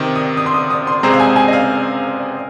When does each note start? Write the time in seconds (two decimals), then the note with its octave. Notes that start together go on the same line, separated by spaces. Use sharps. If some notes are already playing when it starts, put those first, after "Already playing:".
Already playing: C3 D#3 C4
0.16 D#6
0.37 D#6
0.46 C6
0.54 D#6
0.70 D#6
0.87 C6
1.03 C3 G#3 C4 G#4 C5 A#5
1.13 F5
1.20 G#5
1.36 G#5
1.48 D#5
1.53 F5